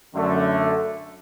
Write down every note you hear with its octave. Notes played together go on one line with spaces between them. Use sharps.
F#2 D3 A3